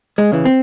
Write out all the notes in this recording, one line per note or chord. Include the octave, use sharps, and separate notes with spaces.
G#3
C#3 E3
C4